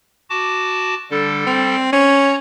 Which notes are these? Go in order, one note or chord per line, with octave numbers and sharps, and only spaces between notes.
F#4 A5 D6
D3 G3 A4
C4
C#4 C#5 A#5